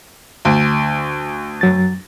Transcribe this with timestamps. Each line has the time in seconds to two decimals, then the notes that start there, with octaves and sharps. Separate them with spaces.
0.45 D2
1.61 F#2 F#3 A6